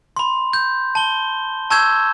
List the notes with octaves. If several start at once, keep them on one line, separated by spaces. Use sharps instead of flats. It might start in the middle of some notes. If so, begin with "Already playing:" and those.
B5 C6
G6
A5 G7
A5 C#6 E6 G6 G#6 E7